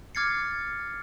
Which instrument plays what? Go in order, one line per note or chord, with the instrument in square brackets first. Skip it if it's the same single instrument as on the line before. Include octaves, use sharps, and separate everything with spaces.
[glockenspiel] D6 F6 G#6 A6 C7 C#7